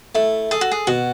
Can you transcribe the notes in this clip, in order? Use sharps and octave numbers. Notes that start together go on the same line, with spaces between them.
A3 E4
G#4 A4
F#4
G#4
B2 F#4